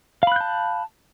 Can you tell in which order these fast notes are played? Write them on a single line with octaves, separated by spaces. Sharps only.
F5 B5 F#6 G6 A5